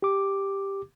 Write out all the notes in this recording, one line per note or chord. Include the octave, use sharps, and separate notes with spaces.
G4 D6